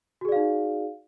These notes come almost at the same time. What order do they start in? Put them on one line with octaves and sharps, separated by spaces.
F#4 G#4 D5 F5 D#4